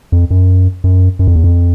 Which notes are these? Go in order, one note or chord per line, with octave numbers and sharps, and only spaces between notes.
F2
F#2
F#2
F#2
F2
E2
F2